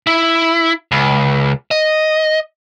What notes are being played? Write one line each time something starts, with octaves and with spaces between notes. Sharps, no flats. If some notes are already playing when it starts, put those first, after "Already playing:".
E4
C#2
D#5